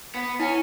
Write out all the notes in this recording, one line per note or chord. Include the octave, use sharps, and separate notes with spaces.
B3
C#4 E4